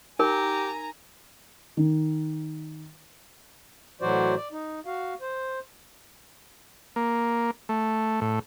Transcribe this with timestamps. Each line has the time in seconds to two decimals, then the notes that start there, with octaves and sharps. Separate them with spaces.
0.19 D#4 G4 A#4 G#5 A#5
1.77 D#3
4.01 A2 E3 F#3 F#4 C5 D5
4.36 D5
4.52 D#4
4.86 F#4 F5
5.21 C5
6.96 A#3
7.69 A3
8.21 A2